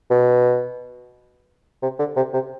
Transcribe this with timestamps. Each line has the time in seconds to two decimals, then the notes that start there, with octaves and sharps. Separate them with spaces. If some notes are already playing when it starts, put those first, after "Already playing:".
0.11 B2
1.82 C3
1.99 D3
2.16 C3
2.34 C3